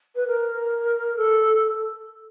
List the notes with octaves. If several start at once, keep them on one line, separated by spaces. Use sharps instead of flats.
B4
A#4
A4